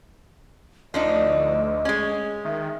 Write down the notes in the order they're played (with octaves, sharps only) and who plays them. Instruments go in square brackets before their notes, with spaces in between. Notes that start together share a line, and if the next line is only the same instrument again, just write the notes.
[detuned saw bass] D2 [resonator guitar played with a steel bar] F3 D4 D#4 [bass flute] D#5
[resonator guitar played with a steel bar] G#3 C#4
[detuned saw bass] D#3 [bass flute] E5